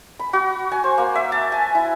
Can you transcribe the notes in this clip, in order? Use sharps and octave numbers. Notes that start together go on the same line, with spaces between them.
B5
F#4
G#5
C5
A#3
E5
A5
G#5
E4